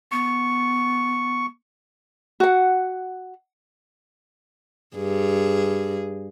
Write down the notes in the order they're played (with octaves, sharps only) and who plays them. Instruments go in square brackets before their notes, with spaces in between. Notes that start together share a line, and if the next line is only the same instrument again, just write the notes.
[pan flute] B3 [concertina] C#6
[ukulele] F#4 F#5
[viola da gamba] G2 G#4